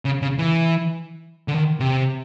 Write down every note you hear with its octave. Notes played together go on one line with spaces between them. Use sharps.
C#3
C#3
E3
D3
D#3
C3